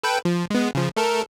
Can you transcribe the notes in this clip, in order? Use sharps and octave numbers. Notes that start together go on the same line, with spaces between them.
A4 B4 G5
F3
G#3 B3
C#3 F3
A3 A4 A#4